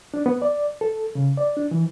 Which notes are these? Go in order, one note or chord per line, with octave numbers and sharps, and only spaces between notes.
D4
B3
D5
A4
C#3
D5
D4
E3